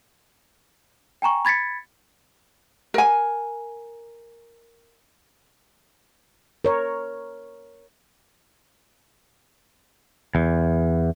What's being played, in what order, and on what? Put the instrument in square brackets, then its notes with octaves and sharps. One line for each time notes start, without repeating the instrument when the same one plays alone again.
[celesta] G5 G#5 A#5 C#6
B5 G#6 A6 B6 C#7
[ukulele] A#4 G#5
[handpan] A#4 C#5
[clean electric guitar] E2